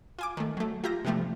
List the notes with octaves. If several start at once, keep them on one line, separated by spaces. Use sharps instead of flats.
F4 G#5 D6
D#3 A3
F#3 A3
F4 G4 E5 A#5 G6 A#6
C3 E3 F3 G3 A3